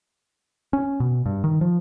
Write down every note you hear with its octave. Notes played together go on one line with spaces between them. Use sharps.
C#4
B2
G2
D#3
F3